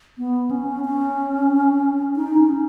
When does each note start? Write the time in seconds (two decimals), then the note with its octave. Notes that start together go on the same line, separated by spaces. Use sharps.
0.18 B3
0.51 C#4
0.84 C#4
2.16 D#4
2.38 C#4